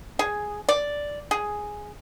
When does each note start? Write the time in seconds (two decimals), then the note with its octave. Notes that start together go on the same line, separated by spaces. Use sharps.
0.19 G#4
0.69 D5
1.31 G#4